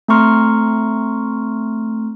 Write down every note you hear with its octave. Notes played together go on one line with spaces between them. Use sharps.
A3 C4 A#5 C6 C#6 F6